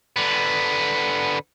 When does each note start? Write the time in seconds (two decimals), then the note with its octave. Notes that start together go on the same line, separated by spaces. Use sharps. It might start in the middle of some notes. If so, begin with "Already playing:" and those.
0.16 D3 B3